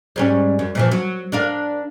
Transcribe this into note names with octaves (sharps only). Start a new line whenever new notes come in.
G#2 G3 C#4
F#2
A#2 E3 F3
F#3
D4 A#4 F5